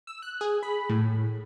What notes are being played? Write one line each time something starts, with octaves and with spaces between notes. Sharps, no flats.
E6
F#6
G#4
B5
A2